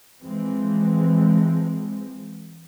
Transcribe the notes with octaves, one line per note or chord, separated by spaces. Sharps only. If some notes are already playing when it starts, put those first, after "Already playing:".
E3 F3 G#3 C4